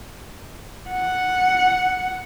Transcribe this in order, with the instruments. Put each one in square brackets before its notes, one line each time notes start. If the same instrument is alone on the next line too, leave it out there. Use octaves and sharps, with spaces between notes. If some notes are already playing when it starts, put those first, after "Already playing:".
[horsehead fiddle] F#5